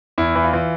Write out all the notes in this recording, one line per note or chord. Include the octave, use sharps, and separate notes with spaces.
E2 E4
E3
F4
E3